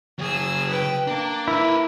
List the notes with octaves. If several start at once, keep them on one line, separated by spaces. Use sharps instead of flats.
C#3 F#3 G#4 E6
B4 G5
A#3 D4
E4 A#4 B4